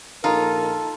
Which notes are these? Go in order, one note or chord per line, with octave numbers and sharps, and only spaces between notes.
A#1 D#4 F4 A4 A#4